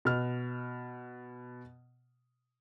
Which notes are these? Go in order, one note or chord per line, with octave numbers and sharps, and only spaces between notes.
B2 F6